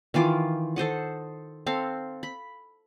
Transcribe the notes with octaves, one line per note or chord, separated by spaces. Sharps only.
D#3 E3 F4 D6
A4 C5 D#5 F#5
C4 A4 F5
B5